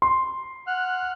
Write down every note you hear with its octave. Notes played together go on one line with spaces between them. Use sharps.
C6
F#5 F6 F#6